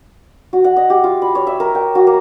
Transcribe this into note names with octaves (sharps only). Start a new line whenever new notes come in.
F#4
F#5
D#5
G4
F4
B5
C#5
E5
A#4
G5
F#4
A#3